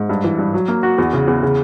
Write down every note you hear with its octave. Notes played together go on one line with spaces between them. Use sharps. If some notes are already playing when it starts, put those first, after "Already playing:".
Already playing: G#2
G2
E3
G2
F#3
A#3
F#4
E2
C#3
E2
C#3